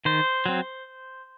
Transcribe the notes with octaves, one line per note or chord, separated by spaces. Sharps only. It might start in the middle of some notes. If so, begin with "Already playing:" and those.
D#3 C5
F#3 C4